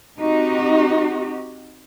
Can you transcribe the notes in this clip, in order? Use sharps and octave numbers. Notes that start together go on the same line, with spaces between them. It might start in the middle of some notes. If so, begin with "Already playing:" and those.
C4 D#4 F#4 G4